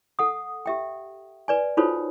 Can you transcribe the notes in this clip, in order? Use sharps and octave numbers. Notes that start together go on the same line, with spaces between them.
A4 F#5 D#6
G4 E5 G5
B4 D5 G#5
D#4 F4 F#4 A4 C5 C#5